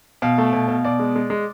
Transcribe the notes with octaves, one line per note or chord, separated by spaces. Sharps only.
B2 F5
A3
B2
B2
B2 D5
G#3
G#3
G#3